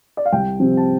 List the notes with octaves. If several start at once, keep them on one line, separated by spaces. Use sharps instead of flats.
D5
F5
C2 G5
C3 F3 C4
A5